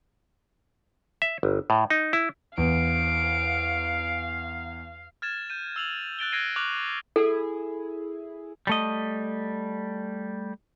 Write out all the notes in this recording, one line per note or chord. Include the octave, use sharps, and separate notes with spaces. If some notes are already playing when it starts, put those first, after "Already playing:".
E5
G1
A2
D#4
E4
E2 F5 D7
F6 G#6 A6 E7
G6 D#7
E6 F7 F#7
F#6 A6 D7 G7
F#6 G#6 A#6 C7 D7 D#7
C#6 D6 F6 F#6 F7 F#7
E4 G#4 A4
G3 A3 D#5